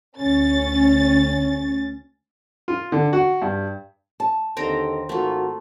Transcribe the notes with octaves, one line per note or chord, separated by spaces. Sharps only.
D2 C#4 A6
F4
D3
F#4
G2
A5
D#2 D3 C4 G5 A#5
G#1 A3 A#3 F4 F#4